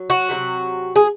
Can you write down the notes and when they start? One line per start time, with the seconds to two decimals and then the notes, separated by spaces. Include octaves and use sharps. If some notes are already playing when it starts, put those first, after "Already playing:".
Already playing: F#3
0.10 F#4
0.29 C3 D#3 F#3
0.96 G#4